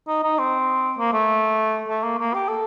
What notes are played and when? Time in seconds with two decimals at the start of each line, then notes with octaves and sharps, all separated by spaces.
0.08 D#4
0.24 D#4
0.39 C4
0.98 A#3
1.13 A3
1.89 A3
2.03 A#3
2.19 A#3
2.34 G4
2.48 A4